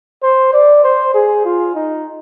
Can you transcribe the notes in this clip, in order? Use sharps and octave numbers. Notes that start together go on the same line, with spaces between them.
C5
D5
C5
G#4
F4
D#4